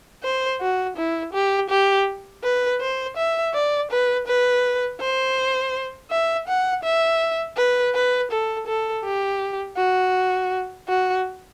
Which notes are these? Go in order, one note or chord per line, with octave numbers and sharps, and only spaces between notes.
C5
F#4
E4
G4
G4
B4
C5
E5
D5
B4
B4
C5
E5
F#5
E5
B4
B4
A4
A4
G4
F#4
F#4